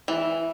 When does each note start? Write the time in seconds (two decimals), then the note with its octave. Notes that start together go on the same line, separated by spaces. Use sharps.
0.08 E3